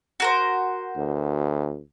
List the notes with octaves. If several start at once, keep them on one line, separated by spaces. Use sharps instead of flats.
F#4 A#4 C5
D2